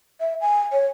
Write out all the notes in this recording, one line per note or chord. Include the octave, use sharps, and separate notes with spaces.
E5
G#5
C#5